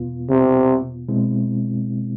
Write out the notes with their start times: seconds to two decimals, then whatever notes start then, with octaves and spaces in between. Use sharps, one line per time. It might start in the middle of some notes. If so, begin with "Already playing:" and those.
Already playing: E2 B2 B3 F4
0.30 C3
1.08 B2 G#3 C4 E4